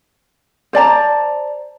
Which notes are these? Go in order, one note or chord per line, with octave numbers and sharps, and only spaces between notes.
C5 D5 A5 A#5